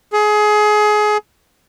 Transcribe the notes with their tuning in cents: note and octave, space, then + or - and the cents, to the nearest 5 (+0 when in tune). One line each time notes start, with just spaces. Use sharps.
G#4 +25